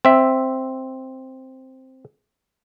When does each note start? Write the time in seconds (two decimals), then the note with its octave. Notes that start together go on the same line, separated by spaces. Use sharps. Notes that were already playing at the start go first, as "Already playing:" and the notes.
0.05 C4 E5